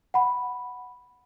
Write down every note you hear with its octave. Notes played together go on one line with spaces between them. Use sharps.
F#5 B5